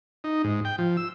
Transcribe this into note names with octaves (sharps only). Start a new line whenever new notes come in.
D#4
G#2
G5
F3
E6